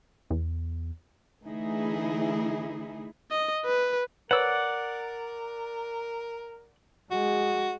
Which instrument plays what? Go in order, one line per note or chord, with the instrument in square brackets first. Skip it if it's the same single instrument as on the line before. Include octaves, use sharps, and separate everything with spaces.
[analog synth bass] E2
[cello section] D3 E3 A3 D#4 E4 G#4
[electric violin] D#5
B4
[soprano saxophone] A#4 [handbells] B4 C#5 E6 [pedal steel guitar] D5 F#5
[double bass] G#3 [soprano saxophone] F#4